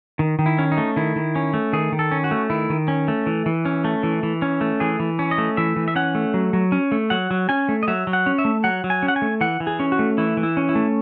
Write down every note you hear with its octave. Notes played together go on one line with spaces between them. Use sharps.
D#3
D#3
E4
C#4
D#4
A3
D#3 E4
D#3
C#4
A3
D#3 G#4
D#3
A4
C#4
F#4
A3
D#3 E4
D#3
C#4
A3
E3
E3
C#4
A3
E3
E3
C#4
A3
E3 G#4
E3
C#4
D#5
A3
E3 E5
E3
E5
C#4 F#5
A3
F#3
F#3
C#4
A3
F#3 F#5
F#3
C#4 G#5
A3
D#5
F#3 E5
F#3
F#5
C#4
E5
A3
F#3 F#5
F#3
G#5
C#4
F#5
G#5
A3
E3 F#5
E3
G#4
C#4
F#4
A3
E3 E4
E3
E4
C#4
E4
A3